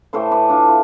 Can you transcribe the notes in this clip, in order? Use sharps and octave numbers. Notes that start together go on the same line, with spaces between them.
A2 E3 A3 A4 C5
B4 D5
D4 F4
E4